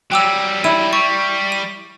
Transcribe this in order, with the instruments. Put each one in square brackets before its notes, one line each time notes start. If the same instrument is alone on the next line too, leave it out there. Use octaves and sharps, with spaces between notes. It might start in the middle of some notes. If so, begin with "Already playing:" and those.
[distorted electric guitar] F#3 G3 [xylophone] G5 D6 E6
[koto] E4 [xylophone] D#7
[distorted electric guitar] G3 [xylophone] C#6
[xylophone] D#7